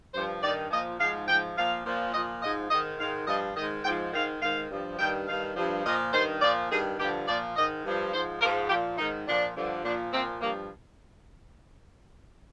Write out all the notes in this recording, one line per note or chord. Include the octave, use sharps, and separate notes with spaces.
G2 F3 C5
G2 D#3 D5
A#2 F3 D#5
G#2 F3 F5
G#2 F3 G5
A#2 F3 F5
A#2 F3
A#2 F3 D#5
G#2 F3 D#5
G#2 D#3 D#5
G#2 D#3 F5
G2 F3 D#5
G#2 D#3 D#5
G#2 F3 G5
G#2 D#3 F5
G#2 D#3 F5
G2 F3
G2 D#3 G5
G2 D#3 F5
G2 F3
A#2 F3 D#5
G2 D#3 C5
A#2 F3 D5
G2 D#3 G#4
G2 D3 F3 G4
A#2 F3 D5
G#2 D#3 D#5
G2 F3
G#2 F3 C5
G#2 F3 A#4
A#2 F3 G4
G#2 D#3 D#4
A#2 F3 D4
G2 D3 F3
A#2 F3 D4
A#2 F3 C4
G2 F3 A#3